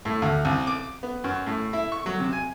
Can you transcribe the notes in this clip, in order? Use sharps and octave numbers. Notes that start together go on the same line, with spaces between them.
A2
D2
C2
D6
B3
F#2
A2
E4
C#6
F#3
C3
G#5